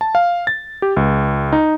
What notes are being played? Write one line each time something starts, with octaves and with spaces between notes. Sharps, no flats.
A5
F5
A6
G4
C#2
D#4